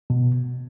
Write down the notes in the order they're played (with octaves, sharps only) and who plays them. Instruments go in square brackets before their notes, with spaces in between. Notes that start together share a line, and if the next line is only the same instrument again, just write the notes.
[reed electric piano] B2